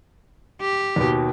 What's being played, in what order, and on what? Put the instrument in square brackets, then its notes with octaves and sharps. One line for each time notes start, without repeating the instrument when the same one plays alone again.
[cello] G4
[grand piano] D#2 B2